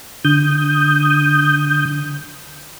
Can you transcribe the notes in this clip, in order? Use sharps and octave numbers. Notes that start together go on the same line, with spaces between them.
D3 D#6 G6